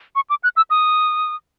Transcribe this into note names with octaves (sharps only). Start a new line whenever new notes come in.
C#6
D6
F#6
E6
D#6